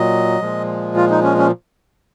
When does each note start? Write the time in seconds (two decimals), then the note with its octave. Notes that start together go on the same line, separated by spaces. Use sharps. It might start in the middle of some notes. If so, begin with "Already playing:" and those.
Already playing: A#2 F#3 D#5
0.41 A#2 F3 G#3
0.96 F4
1.10 D#4
1.24 C#4
1.38 C#4